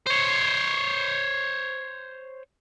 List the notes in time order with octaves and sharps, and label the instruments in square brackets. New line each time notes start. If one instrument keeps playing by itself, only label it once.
[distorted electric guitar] C5 C#5